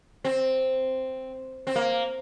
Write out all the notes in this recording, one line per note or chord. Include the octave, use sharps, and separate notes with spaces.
C4
C4
A#3